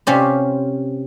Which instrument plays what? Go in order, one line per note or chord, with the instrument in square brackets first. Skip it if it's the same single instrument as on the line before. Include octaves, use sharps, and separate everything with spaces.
[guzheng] C3 C#4 F4 G4 C5